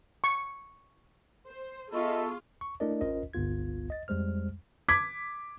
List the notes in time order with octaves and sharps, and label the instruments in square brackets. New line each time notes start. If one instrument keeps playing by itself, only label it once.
[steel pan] C#6
[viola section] C5
[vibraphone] B3 C#6 [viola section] F4 G#4 [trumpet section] A4 E5 [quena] D#5
[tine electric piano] C#6
A3 D4 E4 A#4 D5 D#5
G#1 C#4 F4 A#4 C5 D#5
G1 C#2 B3 F4 G#6
D#5 A6
F2 G3 G#3 C5 F6
[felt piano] D6 G#6 B6